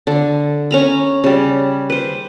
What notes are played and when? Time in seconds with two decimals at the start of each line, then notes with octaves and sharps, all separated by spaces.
0.07 D3
0.71 C#4 A#5 B5
1.24 C#3 G3
1.90 B4 C5